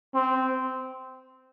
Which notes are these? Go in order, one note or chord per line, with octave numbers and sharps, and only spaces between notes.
C4